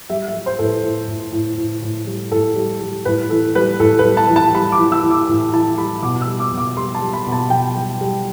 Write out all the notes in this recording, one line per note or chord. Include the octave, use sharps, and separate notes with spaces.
G3 E5
E5
G3
C5
A2 A4
B4
A2
A2
A2
A2
A2
G3
A2 A4
G3
G3
A2 B4
E3 A4
G3 B4
A2 A4
B4
G3
A5
E3
A5
G3 B5
D6
E3
E6
E3
D6
A2
E3 A5
G3 B5
B2 D6
E6
G3
D6
B2 D6
G3 C6
A5
G3
B5
B2
A5
B2 G5
G3
G3